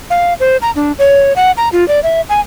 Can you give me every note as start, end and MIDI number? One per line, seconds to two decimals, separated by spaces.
0.10 0.34 77
0.40 0.57 72
0.62 0.71 82
0.76 0.92 62
0.99 1.33 73
1.36 1.52 78
1.57 1.69 82
1.73 1.87 65
1.88 2.00 74
2.03 2.21 76
2.29 2.40 80